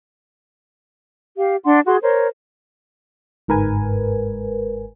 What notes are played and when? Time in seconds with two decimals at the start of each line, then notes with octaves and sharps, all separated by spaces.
1.37 G4 F5
1.64 D4 F#5 C6
1.85 F#4 G#4 C6
2.02 A#4 C5 C#5
3.48 G1 G#2 A#4 B4 G#5